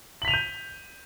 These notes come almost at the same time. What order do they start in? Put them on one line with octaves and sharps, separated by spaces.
F#7 B6 F7 D#7 G6